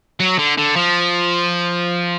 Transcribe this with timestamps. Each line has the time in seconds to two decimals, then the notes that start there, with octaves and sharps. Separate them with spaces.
0.20 F#3
0.39 D3
0.58 D3
0.76 F3